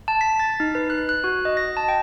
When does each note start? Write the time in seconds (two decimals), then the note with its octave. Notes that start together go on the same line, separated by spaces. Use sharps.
0.08 A5
0.21 B6
0.40 A6
0.60 D#4
0.75 B4
0.90 F#6
1.09 F#6
1.24 F#4
1.45 D#5
1.57 A#6
1.77 A5
1.88 G5